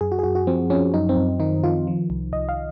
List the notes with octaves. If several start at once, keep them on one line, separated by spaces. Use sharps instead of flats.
F#2 G#4
F#4
G#4
F#2 F#4
F#4
F3 C4
F3 C#4
F#2 D#4
C4
F#2
D#3 D#4
D#3 F4
F3
C2
C2 D#5
F5